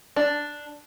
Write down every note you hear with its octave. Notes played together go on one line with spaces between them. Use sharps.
D4